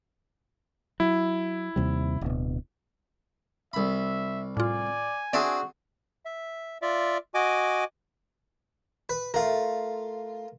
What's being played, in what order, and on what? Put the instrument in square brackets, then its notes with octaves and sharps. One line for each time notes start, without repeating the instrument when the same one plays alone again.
[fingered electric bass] F#3 [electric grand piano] E4
[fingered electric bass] D#2 C3 G3
D1 B2
[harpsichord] C2 B5 [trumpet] E5
[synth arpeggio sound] A2 F4 [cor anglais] D5 [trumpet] G#5
[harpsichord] C4 D4 G#4 [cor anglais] F#4 [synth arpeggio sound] D5 E5
[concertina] E5
F4 D5 E5
F#4 D#5 G#5 D6
[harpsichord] B4
[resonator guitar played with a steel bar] A3 F4 [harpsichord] A#4 F5